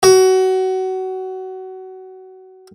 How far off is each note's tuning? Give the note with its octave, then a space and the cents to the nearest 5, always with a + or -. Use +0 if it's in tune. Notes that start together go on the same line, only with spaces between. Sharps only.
F#4 +25